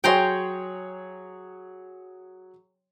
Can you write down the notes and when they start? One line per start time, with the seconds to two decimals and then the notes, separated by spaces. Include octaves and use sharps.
0.04 F#3 G#4 C#5 G5 A#5 C6